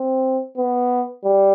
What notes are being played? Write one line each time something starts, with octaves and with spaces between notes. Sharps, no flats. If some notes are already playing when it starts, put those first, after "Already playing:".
Already playing: C4
B3
G3